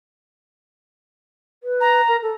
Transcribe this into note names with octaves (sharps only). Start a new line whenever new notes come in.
B4
A#5
A#4
A4